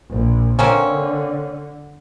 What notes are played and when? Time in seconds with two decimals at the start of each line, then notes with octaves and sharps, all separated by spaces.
0.10 A#1
0.59 D3 A#3 C4 C#4